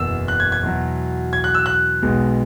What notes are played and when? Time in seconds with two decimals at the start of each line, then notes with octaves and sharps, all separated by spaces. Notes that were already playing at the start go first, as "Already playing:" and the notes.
Already playing: F#1 E2 B2 B3 E6
0.28 F#6
0.40 G#6
0.52 G#6
0.63 E2 B2 F#3
1.33 G#6
1.44 F#6
1.55 E6
1.66 F#6
2.02 B1 B2 G#3 B3